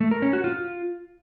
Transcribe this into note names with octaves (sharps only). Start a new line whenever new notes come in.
A3
A#4
C#4
F#4
F4